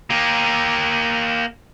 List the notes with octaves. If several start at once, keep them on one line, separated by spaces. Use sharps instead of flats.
A#3 G4